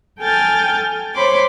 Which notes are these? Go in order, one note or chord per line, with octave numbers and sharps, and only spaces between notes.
A4 G5 G#5 F6 G6 A6
C5 C#5 B5 C6 D6